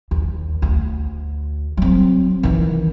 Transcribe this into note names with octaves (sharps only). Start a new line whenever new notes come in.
D#2
D2
F#3 C4
D#3 E3